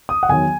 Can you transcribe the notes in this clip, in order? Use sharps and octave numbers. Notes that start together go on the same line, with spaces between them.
D#6
F#5
E2 D#3 F#3 G#5